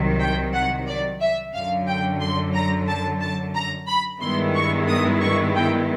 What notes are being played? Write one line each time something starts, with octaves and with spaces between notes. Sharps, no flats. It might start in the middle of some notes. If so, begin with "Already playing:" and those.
Already playing: C2 C3 D#3 F#3
G5
F#5
D5
E5
F#2 D3 F#3 F5
G5
C6
A#5
A5
A5
A#5
B5
G2 D#3 G#3 B3 E4 C6
C#6
D#6
C#6
G5